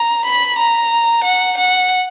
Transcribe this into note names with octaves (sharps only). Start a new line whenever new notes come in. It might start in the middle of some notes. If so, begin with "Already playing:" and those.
Already playing: A#5
B5
A#5
F#5
F#5